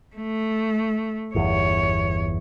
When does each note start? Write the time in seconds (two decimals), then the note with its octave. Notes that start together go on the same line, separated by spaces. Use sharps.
0.16 A3
1.35 G1 E2 C#5